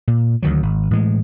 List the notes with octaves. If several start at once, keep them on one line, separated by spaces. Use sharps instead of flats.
A#2
D2 D#3 F#3
G#1
A2 E3 G#3